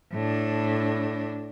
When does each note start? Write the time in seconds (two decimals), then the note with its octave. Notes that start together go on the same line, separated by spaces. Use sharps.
0.13 A2 D4